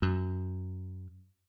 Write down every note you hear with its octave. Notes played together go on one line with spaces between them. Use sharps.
F#2